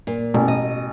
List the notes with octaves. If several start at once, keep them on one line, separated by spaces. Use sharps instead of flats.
A#2
A1 B2
D#5